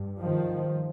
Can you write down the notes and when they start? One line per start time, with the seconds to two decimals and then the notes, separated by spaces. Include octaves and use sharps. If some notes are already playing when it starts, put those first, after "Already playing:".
Already playing: G2
0.21 D#3 F3